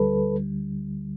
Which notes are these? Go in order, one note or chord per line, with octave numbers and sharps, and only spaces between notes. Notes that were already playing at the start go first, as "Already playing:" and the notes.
Already playing: D2 D3 G3 A4 B4